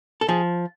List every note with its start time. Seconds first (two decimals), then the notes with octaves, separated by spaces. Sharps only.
0.21 A4
0.29 F3 G#4